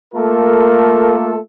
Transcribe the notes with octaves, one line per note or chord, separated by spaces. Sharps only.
A3 A#3 F4 A4 A#4